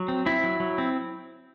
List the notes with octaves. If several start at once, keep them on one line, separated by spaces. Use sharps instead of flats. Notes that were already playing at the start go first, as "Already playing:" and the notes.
Already playing: F#3
C4
C4 E4
F#3
F#3
C4